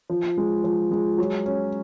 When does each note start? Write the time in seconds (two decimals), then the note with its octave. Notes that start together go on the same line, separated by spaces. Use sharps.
0.10 F3
0.38 G#3
0.64 F3
0.91 G#3
1.18 F#3
1.46 C#4